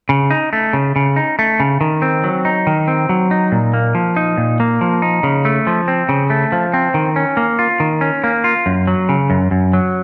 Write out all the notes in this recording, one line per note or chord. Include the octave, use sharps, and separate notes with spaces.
C#3
D#4
A3
C#3
C#3
D#4
A3
C#3
D#3
C4
F#3
D#4
D#3
C4
F#3
D#4
A#2
A#3
F3
D#4
A#2
A#3
F3
D#4
C#3
A3
F3
C4
C#3
A3
F3
C4
D#3
C#4
A#3
F4
D#3
C#4
A#3
F4
F#2
F#3
C#3
F#2
F#2
F#3